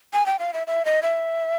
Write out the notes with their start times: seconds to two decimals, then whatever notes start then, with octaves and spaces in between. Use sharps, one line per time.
0.13 G#5
0.26 G5
0.39 F5
0.53 E5
0.67 E5
0.85 D#5
1.02 E5